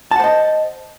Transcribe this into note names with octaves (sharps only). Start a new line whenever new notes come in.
C5 D#5 F#5 A5